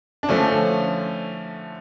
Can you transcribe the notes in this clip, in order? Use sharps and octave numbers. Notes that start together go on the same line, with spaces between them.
D4
D3 F3 A3 C#4